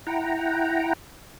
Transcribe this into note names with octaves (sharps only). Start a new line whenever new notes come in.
E4 F#5 G5 A#5